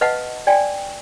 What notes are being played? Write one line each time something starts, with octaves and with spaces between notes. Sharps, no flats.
B4 D#5 F5 F#5 A5
D5 G5 G#5